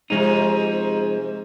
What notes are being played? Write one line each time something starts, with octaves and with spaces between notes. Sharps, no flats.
G#2 C3 F3 G#3 D#4